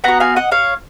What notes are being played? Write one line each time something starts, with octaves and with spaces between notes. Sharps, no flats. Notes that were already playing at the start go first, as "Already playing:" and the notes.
B3 F#4 F#5 A#5
F5 G#5
D#5 F#5
C#5 F5